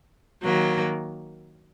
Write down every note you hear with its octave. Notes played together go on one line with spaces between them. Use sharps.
D#3 F#3 A#3